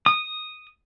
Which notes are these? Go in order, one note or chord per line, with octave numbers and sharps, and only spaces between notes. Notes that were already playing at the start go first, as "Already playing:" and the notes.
D#6